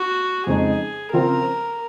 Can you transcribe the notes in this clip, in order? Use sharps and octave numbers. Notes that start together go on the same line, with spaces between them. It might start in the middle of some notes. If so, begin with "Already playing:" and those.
Already playing: F#4
F2 C#3 G#3 D#4 G#4
C#3 F3 C4 F4 A#4